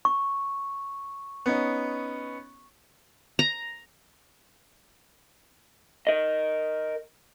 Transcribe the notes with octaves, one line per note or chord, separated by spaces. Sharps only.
C#6
B3 C#4 D#4
A#5
A#4 D#5